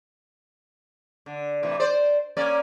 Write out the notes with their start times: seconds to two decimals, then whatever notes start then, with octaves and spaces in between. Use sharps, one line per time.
1.26 D3
1.63 A2 C3 E3
1.80 C5 D5
2.37 A#3 C#4 D5